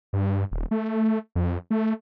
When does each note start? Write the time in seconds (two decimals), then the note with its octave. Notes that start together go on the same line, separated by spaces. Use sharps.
0.13 G2
0.52 D#1
0.71 A3
1.35 F2
1.70 A3